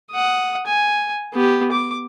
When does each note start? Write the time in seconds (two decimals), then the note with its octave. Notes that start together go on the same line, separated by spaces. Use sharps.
0.11 F#5 D#6
0.66 G#5
1.33 B3 G4
1.72 D6